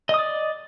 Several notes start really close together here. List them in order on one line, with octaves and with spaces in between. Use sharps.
D#5 D#6 D5